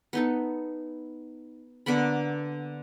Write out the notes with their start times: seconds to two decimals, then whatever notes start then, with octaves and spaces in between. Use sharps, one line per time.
0.13 B3 D#4 A4
1.86 D3 A#3 B3 B5